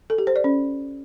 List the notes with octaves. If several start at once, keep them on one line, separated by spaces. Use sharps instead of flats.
A4
G4
C5
D5
C#4